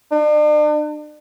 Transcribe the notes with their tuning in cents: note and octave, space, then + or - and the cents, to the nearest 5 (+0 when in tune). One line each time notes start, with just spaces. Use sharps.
D4 +40